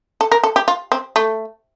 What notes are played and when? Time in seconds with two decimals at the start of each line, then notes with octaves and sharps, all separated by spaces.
0.21 A4
0.32 A#4
0.44 A4
0.56 G4
0.68 F4
0.92 C4
1.16 A3